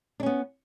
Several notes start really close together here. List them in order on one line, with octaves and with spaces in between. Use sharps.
D4 C#4 B3